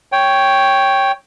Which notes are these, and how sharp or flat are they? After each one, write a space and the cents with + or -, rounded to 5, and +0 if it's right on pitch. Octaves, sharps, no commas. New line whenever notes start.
C#5 +0 G5 +0